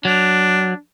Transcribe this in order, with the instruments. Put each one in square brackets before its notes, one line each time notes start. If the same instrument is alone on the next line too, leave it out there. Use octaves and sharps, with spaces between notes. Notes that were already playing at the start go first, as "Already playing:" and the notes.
[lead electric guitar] F#3 [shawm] D4